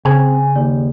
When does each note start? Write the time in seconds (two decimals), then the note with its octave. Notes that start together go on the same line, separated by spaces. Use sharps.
0.05 C#3 C4 G#4 G#5
0.56 D#2 D5